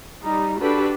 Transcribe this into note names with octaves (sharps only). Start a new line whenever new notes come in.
G3 D#4
D4 F#4 G4 A4 B4